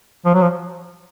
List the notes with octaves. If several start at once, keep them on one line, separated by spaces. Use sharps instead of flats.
F3
F#3
F3